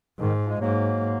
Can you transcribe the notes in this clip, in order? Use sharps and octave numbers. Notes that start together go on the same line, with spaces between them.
G#2 D#3
F3 G#3
G#2 F#3 A#3